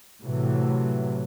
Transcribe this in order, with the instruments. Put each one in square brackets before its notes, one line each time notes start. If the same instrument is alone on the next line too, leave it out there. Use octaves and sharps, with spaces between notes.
[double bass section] A2 C3 E3 F#3